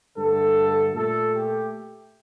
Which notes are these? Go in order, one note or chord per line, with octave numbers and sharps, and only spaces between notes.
G2 D3 A3 A4
A#2 A3 A4
G4